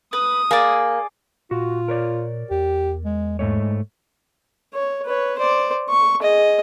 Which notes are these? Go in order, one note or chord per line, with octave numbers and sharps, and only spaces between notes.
B4 D#6
A#3 G#4 D5
A#2 F4 F#4
A#4 C#5 D5
E2 G4
G#3
G#2 G#3 A3 C#5
C#5
B4 C#5
C5 D5
C#6
G#4 D#5